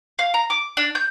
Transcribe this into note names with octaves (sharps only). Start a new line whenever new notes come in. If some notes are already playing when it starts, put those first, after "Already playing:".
F5
A#5
D6
D4
G6